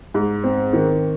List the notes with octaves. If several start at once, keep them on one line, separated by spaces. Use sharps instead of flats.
G#2
C4
D#3